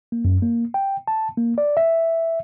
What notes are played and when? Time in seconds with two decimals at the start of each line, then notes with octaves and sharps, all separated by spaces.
0.12 A#3
0.25 F#2
0.42 A#3
0.74 G5
1.08 A5
1.38 A#3
1.58 D5
1.77 E5